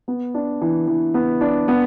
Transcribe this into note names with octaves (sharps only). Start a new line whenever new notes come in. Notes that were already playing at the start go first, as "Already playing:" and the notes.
B3
D4
E3
E3
B3
D4
B3